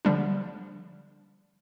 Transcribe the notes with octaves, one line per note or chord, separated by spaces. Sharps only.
D3 F3 G3 D4